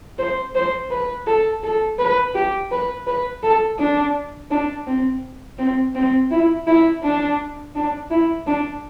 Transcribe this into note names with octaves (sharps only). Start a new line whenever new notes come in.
C5
C5
B4
A4
A4
B4
G4
B4
B4
A4
D4
D4
C4
C4
C4
E4
E4
D4
D4
E4
D4